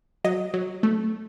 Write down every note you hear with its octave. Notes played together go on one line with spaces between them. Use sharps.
F#3 D#5
F#3
A3